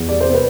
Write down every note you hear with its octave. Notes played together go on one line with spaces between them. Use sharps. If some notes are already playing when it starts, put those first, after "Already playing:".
Already playing: E2
G3 D5
C5
C3
B4